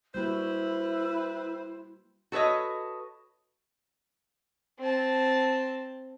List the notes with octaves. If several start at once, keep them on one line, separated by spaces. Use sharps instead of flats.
G3 A#3 E4 F#4 G4 B4 C5
F#4 A4 B4 C#5 D#5
C4 A5